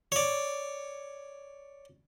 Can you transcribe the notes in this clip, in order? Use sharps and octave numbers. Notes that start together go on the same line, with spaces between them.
C#5 D5